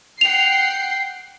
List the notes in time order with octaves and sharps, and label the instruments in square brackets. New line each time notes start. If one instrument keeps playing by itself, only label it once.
[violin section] F#5 G5 C7 [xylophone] F7